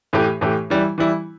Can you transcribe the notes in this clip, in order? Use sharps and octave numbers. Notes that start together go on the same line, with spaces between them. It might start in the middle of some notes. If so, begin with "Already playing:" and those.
A2 E3 A3 G4
A2 E3 A3 G4
E3 G3 E4
E3 G3 E4